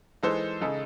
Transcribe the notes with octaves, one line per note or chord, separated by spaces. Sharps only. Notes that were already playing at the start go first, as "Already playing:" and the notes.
E3 G#3 D#4 A4 C5
C#3 G#3 D#4 A4